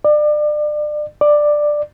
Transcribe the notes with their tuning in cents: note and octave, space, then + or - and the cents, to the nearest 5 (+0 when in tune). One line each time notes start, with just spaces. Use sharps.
D5 +30
D5 +10